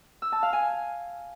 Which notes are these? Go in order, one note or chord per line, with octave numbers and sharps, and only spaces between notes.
E6
A5
F5
G#5